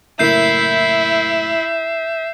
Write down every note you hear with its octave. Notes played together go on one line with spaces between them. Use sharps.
F#1 A2 E4 A#4 E5 G6 C7